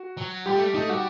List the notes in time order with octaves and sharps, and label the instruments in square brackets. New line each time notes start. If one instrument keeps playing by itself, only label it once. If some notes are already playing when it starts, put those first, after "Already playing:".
Already playing: [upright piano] F#4
[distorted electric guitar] F#3
[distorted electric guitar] G3 [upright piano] G4
[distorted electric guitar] A3
G3
[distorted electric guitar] A3 [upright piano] D#4
[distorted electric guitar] G3 [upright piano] F#4